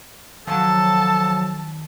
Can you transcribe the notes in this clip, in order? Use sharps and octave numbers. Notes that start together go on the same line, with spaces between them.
D#3 F3 F#3 A4 A5